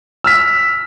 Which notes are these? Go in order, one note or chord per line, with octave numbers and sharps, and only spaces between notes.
E6 F6 B6